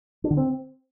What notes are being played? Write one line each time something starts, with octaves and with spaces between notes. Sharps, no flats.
D4
D3
C4